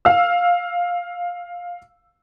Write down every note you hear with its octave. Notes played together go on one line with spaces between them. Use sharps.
F5 E6